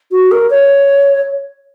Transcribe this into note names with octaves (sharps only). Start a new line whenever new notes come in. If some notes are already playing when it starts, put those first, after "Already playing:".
F#4
A#4
C#5